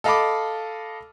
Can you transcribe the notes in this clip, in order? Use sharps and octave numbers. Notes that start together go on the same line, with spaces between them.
A4 D#5 F5 A5 B5 D6